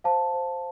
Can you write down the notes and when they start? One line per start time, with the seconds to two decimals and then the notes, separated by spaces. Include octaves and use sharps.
0.04 C5 F5 A5
0.34 C5